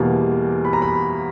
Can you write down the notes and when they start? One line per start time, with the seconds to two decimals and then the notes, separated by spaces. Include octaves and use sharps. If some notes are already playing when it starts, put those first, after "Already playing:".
Already playing: E2 B2 G3 A#3
0.65 B5
0.73 A#5
0.82 B5